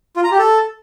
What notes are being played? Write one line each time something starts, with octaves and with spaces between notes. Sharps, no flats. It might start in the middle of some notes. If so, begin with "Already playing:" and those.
F4
A#5
G4
A4